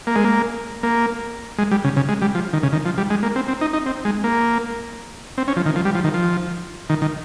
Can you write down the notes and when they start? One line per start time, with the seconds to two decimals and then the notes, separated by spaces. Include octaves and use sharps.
0.07 A#3
0.16 G#3
0.24 A#3
0.83 A#3
1.58 G#3
1.71 G3
1.84 C#3
1.97 C#3
2.09 G#3
2.22 G3
2.35 F3
2.53 D#3
2.63 C#3
2.73 D#3
2.86 F3
2.98 G3
3.10 G#3
3.23 A#3
3.36 C4
3.48 C4
3.61 D#4
3.73 D#4
3.86 C4
4.05 G#3
4.24 A#3
5.38 C4
5.48 C#4
5.57 F3
5.66 D#3
5.76 F3
5.85 G3
5.95 F3
6.04 D#3
6.14 F3
6.90 D#3
7.02 D#3